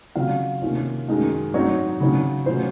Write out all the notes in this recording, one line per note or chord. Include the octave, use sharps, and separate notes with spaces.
C#3 F#3 C4 F4 F5
C3 D#3 A#3 C#4 F4
F#2 D#3 G#3
G#2 F#3 C4 D#4 C#5
C#3 F#3 C4 D#4
C#3 F#3 C#4 F4 C5